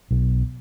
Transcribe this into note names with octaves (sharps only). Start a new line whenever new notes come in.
B1